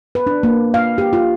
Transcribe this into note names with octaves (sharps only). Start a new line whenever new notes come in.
B4
D4
A#3
F5
G4
F4